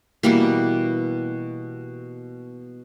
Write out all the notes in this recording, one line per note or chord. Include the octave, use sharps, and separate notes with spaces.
B2 E3 G3 A#3